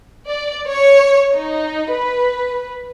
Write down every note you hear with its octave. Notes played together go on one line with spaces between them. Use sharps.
D5
C#5
D#4
B4